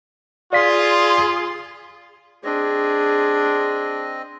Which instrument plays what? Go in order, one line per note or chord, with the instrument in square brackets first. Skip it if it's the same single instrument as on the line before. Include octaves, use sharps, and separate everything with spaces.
[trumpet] F4 [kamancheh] G#4 C6 [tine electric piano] D5 F5 B6
[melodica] C4 D#5 [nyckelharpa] D4 G#4